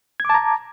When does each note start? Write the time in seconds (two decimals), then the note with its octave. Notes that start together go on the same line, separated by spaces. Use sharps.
0.20 G#6
0.25 D6
0.30 A5
0.34 A#5